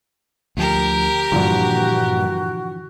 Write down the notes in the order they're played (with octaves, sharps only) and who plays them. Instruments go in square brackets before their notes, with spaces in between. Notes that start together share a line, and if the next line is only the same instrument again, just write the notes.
[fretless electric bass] D2 F3 [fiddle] G4 A#4
[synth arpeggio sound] G2 A#2 [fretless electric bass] D3 E3 F3 [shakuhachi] F#4